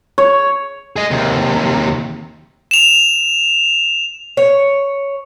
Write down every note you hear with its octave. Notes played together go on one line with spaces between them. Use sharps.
C#5
G#4 D#5
D#2 C3
E7 F7
C#5